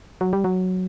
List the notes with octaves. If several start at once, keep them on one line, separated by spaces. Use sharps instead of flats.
F#3
G3
F#3